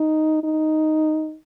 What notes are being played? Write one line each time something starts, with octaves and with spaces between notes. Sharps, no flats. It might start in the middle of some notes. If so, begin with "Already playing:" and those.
Already playing: D#4
D#4